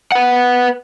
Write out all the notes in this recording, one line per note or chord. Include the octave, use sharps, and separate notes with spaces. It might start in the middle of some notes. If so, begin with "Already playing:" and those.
B4 F#5